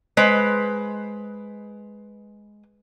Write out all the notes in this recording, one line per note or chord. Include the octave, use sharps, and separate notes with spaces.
G#3 B4 C5